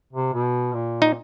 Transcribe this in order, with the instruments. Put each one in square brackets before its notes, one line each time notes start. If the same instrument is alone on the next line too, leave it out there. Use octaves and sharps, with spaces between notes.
[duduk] C3
B2
A#2
[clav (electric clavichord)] D#4